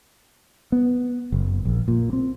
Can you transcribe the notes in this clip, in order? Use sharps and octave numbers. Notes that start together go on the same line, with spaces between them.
B3
F#1
A#1
A#2
C4